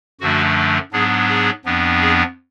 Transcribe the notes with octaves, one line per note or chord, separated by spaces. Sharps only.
F#2 D3 F3 A3 D4 F#4
G#2 F#3 B3 D4 G#4
G#4
F2 F3 B3 D4
G#4